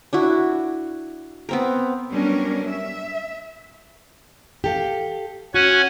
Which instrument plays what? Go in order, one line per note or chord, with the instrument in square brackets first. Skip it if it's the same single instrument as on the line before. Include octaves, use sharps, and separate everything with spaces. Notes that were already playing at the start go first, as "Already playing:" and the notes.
[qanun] D4 E4 F#4
B3 C4 A#4
[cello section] F#3 G3 B3 C#4 D4 A#4
E5
[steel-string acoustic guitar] G4 A4 F5
[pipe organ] C#4 F#5 G#5 [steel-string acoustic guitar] F#4